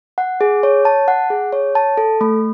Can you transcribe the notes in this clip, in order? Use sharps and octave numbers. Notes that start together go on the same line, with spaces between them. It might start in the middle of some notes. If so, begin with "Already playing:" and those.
F#5
G#4
C#5
A5
F#5
G#4
C#5
A5
A4
A3